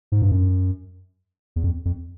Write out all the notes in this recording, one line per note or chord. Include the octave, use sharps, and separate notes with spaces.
G#2
G2
F#2
E2
F2
F2